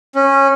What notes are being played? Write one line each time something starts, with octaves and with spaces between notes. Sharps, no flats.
C#4